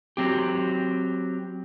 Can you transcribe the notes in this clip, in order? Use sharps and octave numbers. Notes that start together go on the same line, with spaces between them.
F#3 C4 G4